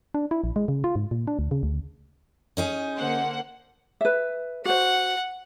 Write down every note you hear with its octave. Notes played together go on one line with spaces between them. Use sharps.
D4
E4
A#1
G#3
C#3
F4
G#2
A#2
D4
D2
C#3
D2
C#4 D#4 G#4
D3 A#3 C5 F#5
B4 E5
F#4 C5 F#5